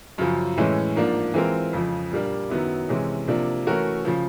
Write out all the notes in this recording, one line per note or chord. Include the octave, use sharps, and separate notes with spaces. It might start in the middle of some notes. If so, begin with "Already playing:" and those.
F#2 C#3 F3
A2 E3 G#3 C#4
G#2 F3 A#3 D4
E3 G#3 C4 F4 A#4
F2 C#3 F3
A#2 G3 A#3 D4
F#2 D#3 F#3 B3 E4
C3 E3 G#3 C#4
C3 F3 A#3 D4
E3 A3 C#4 F#4 A#4
C#3 F3